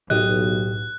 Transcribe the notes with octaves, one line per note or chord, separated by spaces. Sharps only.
B1 A2 F4 G4 D#5 F#6